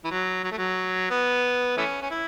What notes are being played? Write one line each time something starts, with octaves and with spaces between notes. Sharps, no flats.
E3
F#3
F#3
A3
F#3
B3
E3 A3 C#4
C#4
E4